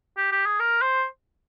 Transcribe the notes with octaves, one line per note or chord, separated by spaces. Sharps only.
G4
G4
G#4
A#4
C5